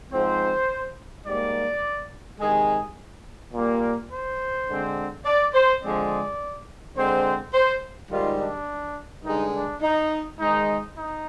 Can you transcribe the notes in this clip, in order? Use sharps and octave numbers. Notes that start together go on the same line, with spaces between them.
G#2 F3 C4 C5
G#2 G3 A#3 D5
C3 D#3 G#3 G#4
A#2 G3 A#3
C5
D3 G#3 C4
D5
C5
D3 F3 G#3 C4 D5
D3 G#3 C4 C5
C5
G#2 D#3 G3 F4
D4
G2 D3 G#3 D#4
D4
D#4
G#2 D#3 G#3 D#4
D#4